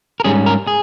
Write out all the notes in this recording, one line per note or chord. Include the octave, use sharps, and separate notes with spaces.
A#4
G#2 G3 C#4 G#4
A#4
G#4